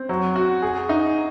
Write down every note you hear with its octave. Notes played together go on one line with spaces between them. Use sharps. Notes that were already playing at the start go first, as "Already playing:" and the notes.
Already playing: C4
F#3
F#4
G#4
D#4